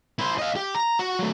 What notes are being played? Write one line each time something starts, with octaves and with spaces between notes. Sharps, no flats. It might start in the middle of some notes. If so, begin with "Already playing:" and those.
E4 C5
D#5 F5
G4
A#5
F#4
F#3 A3